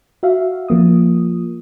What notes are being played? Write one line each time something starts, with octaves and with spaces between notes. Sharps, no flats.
F#4 E5 F5
F3 A#3 D#6